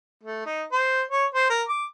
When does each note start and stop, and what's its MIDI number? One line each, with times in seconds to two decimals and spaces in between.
0.24 0.44 57
0.46 0.63 63
0.72 1.02 72
1.11 1.25 73
1.34 1.48 72
1.50 1.63 70
1.68 1.85 86